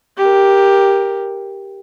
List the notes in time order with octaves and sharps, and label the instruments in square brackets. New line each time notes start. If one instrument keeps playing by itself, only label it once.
[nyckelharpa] G4 A#4